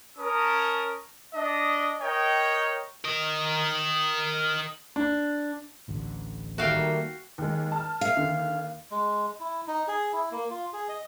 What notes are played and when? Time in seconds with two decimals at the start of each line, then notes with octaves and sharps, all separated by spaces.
0.18 C#4 A#4 A5 D#6
1.35 D4 D#5
2.01 A#4 C#5 D#5 G5
3.05 A#4 D#5
4.96 D4
5.88 D1 A1 D3
6.58 D#3 G3 A3 A#3 F#4 F5 G5
7.38 D#2 G#3
7.72 A5 F6
8.01 F5
8.17 D#2 D3
8.91 G#3
9.40 E4
9.67 D#4
9.88 G#4
10.13 E4
10.32 A#3
10.50 F4
10.73 G#4
10.89 D#5